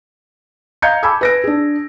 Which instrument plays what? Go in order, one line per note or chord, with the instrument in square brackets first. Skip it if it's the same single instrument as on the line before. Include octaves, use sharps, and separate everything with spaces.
[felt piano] D#5 F5 A#5 G6 G#6 C#7
G#5 A5 B5 D6 E6 G#6
B4 A#6 D7
D4 G#4